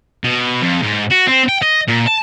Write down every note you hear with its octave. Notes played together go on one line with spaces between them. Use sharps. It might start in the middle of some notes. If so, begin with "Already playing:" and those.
B2
F2
G#2
F#4
C4
G5
D#5
A#2
A5